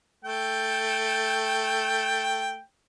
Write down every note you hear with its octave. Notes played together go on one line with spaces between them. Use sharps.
A3 G5